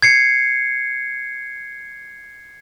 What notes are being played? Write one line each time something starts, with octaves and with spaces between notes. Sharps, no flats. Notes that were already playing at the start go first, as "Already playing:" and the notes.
G#6 C7 C#7